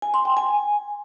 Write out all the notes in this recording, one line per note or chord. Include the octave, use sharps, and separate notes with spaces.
G#5
C6
G5
G#5